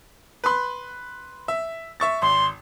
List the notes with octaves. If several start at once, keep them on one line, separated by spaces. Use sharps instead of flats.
B4 B5 C6
E5
E5 C#6 A6
G#1 C6